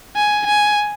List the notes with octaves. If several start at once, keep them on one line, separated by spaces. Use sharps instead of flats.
G#5
G#5